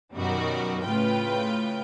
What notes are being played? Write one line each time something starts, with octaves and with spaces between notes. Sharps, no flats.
F#2 B2 D#3 G3 F#4
A2 C#3 F4 B4 G5